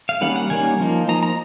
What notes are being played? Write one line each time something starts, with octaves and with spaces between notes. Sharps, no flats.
F5
D#3 G3 A#3 C#4 F#5
F#5
D#3 G3 A#3 C#4 G#5
F3 A#3 D#4
F3 A#3 D#4 A#5
A#5